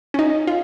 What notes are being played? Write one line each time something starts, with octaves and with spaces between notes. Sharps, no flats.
C#4
D#4
F4